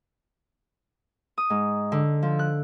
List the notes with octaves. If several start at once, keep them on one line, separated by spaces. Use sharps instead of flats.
D#6
G#2
D3
F3
F#6